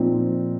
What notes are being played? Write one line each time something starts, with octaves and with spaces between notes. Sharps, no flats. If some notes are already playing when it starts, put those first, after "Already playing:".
Already playing: A#2 F3 C4 D#4